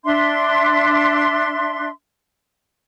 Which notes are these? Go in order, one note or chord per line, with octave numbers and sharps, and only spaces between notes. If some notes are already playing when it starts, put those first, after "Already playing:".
D4 E5 C6